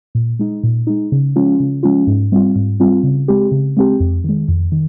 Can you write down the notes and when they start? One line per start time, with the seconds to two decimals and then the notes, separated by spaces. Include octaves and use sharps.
0.15 A#2
0.39 G#3 D#4
0.63 A#2
0.87 G#3 D#4
1.12 C#3
1.36 F3 G#3 C#4 F4
1.60 C#3
1.83 F3 G#3 C#4 F4
2.07 G#2
2.32 G3 C4 F4
2.56 G#2
2.80 G3 C4 F4
3.03 C#3
3.28 G#3 C4 G4
3.52 C#3
3.77 G#3 C4 G4
4.00 F2
4.24 D#3 G#3
4.48 F2
4.72 D#3